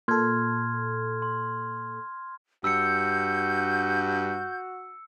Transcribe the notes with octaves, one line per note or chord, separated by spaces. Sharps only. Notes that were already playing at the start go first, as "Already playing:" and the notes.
A#2 A4 C6 F6 G#6
C6
G2 F#4 E6 G6 C#7